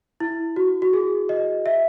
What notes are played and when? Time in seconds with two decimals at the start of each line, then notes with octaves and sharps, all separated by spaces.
0.20 E4
0.56 F#4
0.82 F#4
0.93 G#4
1.29 D#5
1.66 E5